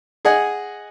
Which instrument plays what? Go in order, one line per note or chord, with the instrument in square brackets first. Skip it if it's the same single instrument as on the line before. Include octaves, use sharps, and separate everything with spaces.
[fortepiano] G#4 D#5 F#5 G#5